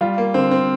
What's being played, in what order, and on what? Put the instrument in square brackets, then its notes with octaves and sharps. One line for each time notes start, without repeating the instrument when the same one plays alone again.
[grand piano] G3 F4
A#3
D3 C4
C4